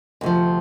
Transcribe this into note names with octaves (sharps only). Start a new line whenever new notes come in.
D2 C3 F3